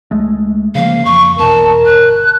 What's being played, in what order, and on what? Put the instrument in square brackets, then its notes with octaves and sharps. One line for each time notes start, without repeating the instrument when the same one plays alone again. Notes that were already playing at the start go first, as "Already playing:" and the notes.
[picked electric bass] C#2 G#3 A3
[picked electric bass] C#3 F3 A#3 [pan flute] F5
[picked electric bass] F2 F3 [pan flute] C#6
[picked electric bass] E2 B2 [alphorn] A#4 [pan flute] A5
[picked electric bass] G1 [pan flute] F#6